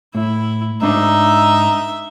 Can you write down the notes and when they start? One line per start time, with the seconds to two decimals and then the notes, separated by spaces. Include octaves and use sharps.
0.15 A2 E4
0.82 G#2 D4 D#4 E5 A#5